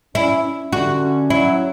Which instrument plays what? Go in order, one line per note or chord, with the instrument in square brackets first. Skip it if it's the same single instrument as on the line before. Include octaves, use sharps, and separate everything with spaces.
[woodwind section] C#4 [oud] E4
[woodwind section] C#4
[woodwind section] D3 [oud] F#4
[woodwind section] C#4
[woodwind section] F#3 [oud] E4